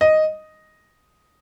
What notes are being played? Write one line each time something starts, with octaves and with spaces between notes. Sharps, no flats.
D#5